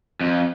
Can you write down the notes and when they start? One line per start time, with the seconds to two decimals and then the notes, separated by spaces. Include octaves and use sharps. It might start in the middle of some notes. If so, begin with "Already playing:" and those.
0.21 F2